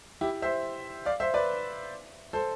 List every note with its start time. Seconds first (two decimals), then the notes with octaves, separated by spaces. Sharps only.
0.21 E4 G4
0.42 C5 E5
1.05 D5 F5
1.20 C5 E5
1.34 B4 D5
2.33 A4 C5